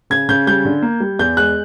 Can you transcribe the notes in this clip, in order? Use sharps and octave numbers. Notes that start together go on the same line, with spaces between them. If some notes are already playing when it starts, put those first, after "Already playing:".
C#3 G#6
C#3 G6
G3 G6
D3
A#3
G3
E2 G6
G#3 F#6